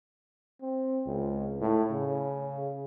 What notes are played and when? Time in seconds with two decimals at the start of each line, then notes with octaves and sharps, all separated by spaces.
0.62 C4
1.06 C#2
1.61 A2
1.91 C#3